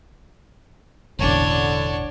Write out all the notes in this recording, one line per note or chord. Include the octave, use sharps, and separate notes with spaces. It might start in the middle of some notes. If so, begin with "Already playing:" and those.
E1 A1 D3 D4 C#5